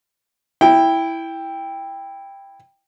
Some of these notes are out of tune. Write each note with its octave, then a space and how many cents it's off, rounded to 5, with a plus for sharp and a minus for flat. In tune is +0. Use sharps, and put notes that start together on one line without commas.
E4 +0 G5 +10